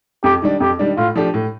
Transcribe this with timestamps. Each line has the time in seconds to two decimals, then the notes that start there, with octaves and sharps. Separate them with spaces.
0.23 F2 G4
0.42 D#3 G3 D4
0.60 F2 G4
0.79 D#3 G3 D4
0.97 A2 F4
1.15 F3 A3 D4 G4
1.34 A2